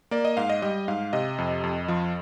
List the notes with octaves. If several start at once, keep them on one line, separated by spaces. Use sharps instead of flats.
A#3 D5
D#5
G#2 F5
D#5
G3 D#5
G#2 F5
C3 D#5
F2
F2
F3